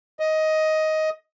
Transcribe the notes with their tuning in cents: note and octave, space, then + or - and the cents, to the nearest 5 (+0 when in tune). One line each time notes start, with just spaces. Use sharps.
D#5 +10